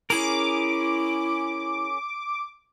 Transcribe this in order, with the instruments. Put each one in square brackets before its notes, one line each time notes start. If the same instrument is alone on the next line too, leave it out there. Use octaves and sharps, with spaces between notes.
[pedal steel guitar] C#4 G#4 A#4 [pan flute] E4 [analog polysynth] D6